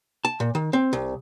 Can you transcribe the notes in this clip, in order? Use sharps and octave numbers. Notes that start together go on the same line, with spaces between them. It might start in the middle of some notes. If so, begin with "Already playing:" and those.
A5
A#2
D#3
C4
C2